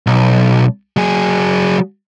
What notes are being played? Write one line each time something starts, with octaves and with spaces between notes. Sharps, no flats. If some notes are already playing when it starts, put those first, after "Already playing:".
B1
F#3 G#4